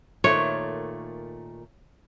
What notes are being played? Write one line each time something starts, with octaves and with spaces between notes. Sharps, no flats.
A#2 D#3 A3 C#5